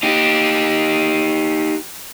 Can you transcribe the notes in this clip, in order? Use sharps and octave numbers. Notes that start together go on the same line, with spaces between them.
D#4 G4